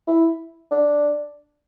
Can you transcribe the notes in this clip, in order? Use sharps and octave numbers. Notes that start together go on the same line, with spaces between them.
E4
D4